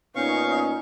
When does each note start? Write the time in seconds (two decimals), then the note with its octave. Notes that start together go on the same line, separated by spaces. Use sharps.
0.15 A#2 B3 C#4 D#4 F5 C#6